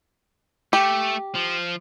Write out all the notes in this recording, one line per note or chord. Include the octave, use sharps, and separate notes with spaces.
A3 G4
F3